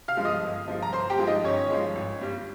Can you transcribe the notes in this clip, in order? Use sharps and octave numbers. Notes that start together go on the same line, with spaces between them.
F5 F6
G2 F3 G#3
D#5 D#6
G1
G2 F3 G#3
A#5
G1 C5 C6
G4 G5
G2 F3 G#3
D#4 D#5
G1 C#4 C#5
G2 F3 G#3
G#1
G2 G3